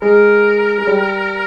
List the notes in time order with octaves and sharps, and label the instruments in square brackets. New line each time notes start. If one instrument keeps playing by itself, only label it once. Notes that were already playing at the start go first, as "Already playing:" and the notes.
[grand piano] G#3 [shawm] A#4
[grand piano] G#3
G3